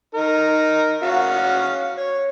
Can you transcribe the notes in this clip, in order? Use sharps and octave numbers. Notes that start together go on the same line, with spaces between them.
D#4 A#4
C#4 F#4 F5
C#5